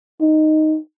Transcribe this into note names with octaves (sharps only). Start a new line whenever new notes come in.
D#4